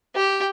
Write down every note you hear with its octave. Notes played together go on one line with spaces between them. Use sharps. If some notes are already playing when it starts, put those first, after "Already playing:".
G4